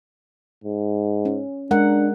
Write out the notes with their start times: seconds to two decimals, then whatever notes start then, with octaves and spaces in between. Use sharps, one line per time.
0.64 G#2
1.25 C#4
1.71 G#3 D4 A#4 F#5